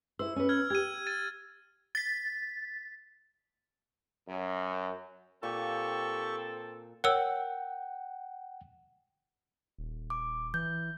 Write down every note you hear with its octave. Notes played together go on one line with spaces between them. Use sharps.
E4 C5 E6
C#4 B4
F6 G#6
G4 G#6 D#7
A6 D#7
A6 B6
F#2
A#2 C4 G4 A4 C#6
A#4 C#5 F#5 G5 E6
D#1
D6
E3 G6